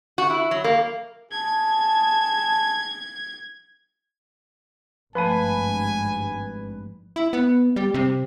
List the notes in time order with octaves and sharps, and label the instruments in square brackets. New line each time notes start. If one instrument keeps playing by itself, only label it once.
[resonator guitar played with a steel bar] F#4
E4
F#3
A#3
[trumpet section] G#4 A5 [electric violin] G#6
[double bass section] G#1 G2 [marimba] F3 A3 [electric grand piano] B4 B5 D#7 [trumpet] G#5
[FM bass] E4
B3
G3
C3